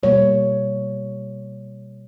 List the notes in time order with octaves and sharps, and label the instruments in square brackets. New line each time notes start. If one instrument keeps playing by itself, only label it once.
[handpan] B2 G3 A#3 C#5